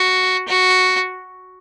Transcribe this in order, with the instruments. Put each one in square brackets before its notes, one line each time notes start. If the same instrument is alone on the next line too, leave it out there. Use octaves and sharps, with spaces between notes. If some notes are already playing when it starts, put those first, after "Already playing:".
Already playing: [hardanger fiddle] F#4
F#4